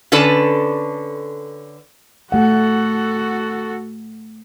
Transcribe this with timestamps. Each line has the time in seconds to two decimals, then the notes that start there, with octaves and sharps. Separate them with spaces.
0.12 D3 C#4 A4 B4 D5 A5
2.32 A3 F#4 A4 F#5